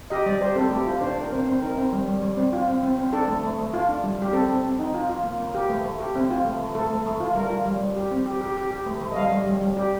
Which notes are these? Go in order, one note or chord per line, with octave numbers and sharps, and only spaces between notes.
G4 D#5
G3 D5
G4 C5
C4 A4
A3 G4
F4
D4 C5
D4 A#4
C4 C5
C4
D#4 A#4
C4
G3
G3
G3
C4
F4
C4
C4
C4
D4 A4
A3
A3
A3
F4
D4
G3
G3 G4
C4 A4
C4
C4
D#4
F4
F4
A#3
A#3
G4
A3
A3
G4
C4
F4
A3
A3
A3 A4
A3
A3
F4
G3 A#4
F4
G3
G3
G4
C4
G4
G4
G4
G4
A3
A3
D#5
G3 F5
G3
G3
G3
G4